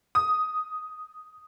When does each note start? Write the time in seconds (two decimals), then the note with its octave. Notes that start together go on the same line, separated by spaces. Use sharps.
0.15 D#6